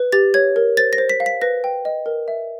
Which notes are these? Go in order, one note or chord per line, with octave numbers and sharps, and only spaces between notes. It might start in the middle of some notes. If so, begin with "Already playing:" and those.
Already playing: B4
G4 A6
C#5 G#6
A#4
C5 A6
A#6
C5
B6
F5
B6
B4 A#6
G5
D#5
A#4
E5